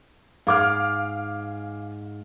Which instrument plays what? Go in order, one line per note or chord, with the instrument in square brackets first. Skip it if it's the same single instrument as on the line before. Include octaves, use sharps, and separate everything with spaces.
[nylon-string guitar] G#2 [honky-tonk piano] F5 D6 F6